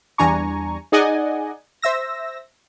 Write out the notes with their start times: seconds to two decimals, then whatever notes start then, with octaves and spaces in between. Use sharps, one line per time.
0.18 E2 G3 D4 G#5 A#5 C#6
0.92 D#4 G#4 D5 D#5 F#5 G#5
1.82 C5 E5 E6 A#6